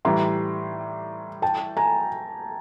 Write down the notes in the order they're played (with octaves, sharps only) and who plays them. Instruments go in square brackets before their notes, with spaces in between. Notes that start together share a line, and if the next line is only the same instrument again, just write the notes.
[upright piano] A2 E3 G3 [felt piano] A#5 C6
[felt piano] G5 A5
G#5 A#5